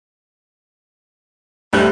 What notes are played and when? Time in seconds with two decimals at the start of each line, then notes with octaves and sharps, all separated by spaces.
1.73 A#1 G3 A3 F#6